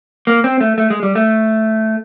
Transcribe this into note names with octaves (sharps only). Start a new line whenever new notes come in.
A#3
C4
A3
A3
G#3
G3
A3